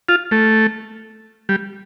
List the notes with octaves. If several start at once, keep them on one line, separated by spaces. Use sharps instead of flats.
F4
A3
G3